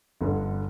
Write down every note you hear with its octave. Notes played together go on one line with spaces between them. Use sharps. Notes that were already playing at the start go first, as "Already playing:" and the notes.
G1 G2 D3